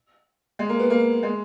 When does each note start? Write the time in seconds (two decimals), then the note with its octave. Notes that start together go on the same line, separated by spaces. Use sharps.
0.59 G#3
0.69 A#3
0.79 B3
0.90 A#3
1.23 G#3